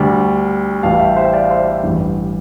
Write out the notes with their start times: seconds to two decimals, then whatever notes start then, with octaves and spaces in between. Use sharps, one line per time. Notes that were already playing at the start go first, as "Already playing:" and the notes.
Already playing: D2 D3 G3
0.83 A1 A2 G3 F5 A5
0.99 E5 G5
1.16 C5 E5
1.33 D5 F5
1.50 C5 E5
1.83 A1 G2 E3